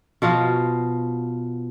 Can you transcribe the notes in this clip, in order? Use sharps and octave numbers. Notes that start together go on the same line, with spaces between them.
B2 F3 F#4 F5